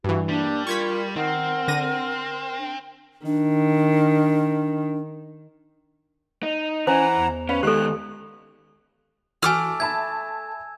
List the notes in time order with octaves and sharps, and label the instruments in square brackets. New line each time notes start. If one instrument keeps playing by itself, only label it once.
[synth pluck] G2 E3 [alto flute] F#4
[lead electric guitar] G3 [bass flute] A#3 [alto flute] D4
[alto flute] F4 [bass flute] A#4 [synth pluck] C#6 G#6 B6
[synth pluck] D#3 [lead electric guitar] C4 [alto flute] A#4 [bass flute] F#5
[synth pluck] D3 A#6 D#7
[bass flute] D4
[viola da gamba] D#3 [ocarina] D4
[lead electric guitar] D#4
[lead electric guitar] E3 [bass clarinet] C#4 [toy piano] C5 [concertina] F#5 A#5
[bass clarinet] E2
[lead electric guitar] C#4 [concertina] B4 [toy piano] F5
[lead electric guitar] D#3 B3 [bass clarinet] G#3 [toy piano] G4 A4 [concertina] F#6
[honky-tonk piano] E3 E4 F#4 [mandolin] A3 D6 F6 [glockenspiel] G#5 E6
[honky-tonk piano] E5 A5 B5 [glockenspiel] G#6